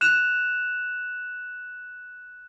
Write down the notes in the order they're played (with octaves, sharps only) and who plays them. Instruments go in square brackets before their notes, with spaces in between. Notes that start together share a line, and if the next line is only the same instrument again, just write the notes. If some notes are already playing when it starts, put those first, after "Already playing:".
[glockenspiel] F#6 E7 F7